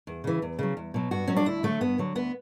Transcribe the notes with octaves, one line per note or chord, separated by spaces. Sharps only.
E2
C#3 E3
E2
C#3 F#3
E2
B2 F#3
G2 F#4
F#3 C#4
D4
D2 E4
D3 F#3 A3
G2 B3
D3 F#3
D2 B3